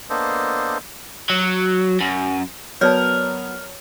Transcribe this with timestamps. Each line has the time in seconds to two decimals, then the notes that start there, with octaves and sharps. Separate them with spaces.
0.10 A#3 B3 D4 A4 C5 D#5
1.30 F#3
2.00 F#2
2.81 F#3 B3 A#4 C#5 D5 A5